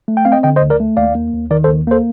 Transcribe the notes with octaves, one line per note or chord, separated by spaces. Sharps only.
A3
G5
C4 F5
D#5 G5
D3 D#5 G5
C5 D#5
D2
A#4 D5
A3
D#2 D5 F5
A#3
D#2
D#3 A#4 D5
A4 C5
D#2
A#3 A4 C5